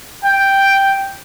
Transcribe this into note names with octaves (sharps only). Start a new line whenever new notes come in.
G5